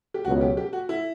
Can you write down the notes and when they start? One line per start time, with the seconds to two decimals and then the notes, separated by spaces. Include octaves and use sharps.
0.14 G4
0.25 C#2 B2 F#3 F#4
0.41 G4
0.57 G4
0.73 F#4
0.89 E4